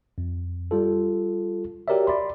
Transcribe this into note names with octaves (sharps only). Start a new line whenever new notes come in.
F2
G3 F4 A4
F#4 G4 A#4 C#5 D5 E5
D5 B5 C6